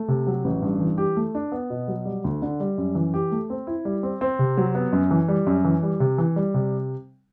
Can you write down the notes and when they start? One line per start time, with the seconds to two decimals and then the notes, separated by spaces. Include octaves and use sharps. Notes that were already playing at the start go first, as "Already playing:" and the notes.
Already playing: A3
0.08 C3
0.27 F#3
0.44 A1
0.62 G2
0.80 E3
0.98 G4
1.16 A3
1.35 D4
1.52 B3
1.70 B2
1.88 F#3
2.05 G3
2.24 D2
2.42 D3
2.60 G3
2.78 F#2
2.95 E3
3.14 G4
3.32 A3
3.50 C4
3.67 E4
3.85 G3
4.03 C4
4.21 C4
4.39 C3
4.57 F#3
4.75 B3
4.93 F#2
5.11 E3
5.28 G3
5.47 F#2
5.65 E3
5.83 G3
6.00 C3
6.18 E3
6.36 G3
6.54 C3